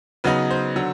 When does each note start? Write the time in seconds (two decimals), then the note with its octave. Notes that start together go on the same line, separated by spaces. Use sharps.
0.24 C#3 F#3 B3 D#4 B4
0.50 C5
0.76 D3 F#3